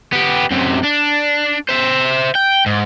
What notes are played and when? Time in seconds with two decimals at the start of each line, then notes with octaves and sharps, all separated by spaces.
0.13 B3 G4
0.51 F#2 C3
0.83 D4
1.69 C5 E5
2.35 G5
2.66 G#2